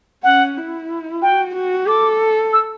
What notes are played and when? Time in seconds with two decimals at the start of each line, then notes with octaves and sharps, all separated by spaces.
0.24 C#4 F#5
0.57 E4
1.22 F#4 G5
1.56 F#4
1.88 A4 D6
2.53 E6